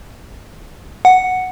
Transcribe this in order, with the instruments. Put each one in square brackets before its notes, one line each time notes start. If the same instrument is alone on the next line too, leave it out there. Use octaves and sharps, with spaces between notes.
[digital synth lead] F#5